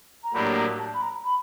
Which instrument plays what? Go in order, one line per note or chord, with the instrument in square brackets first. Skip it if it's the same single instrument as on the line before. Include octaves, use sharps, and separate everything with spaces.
[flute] A#5
[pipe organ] A2 F#3 A#3 D4 G4 [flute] B5
[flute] A#5
A5
B5
A#5
B5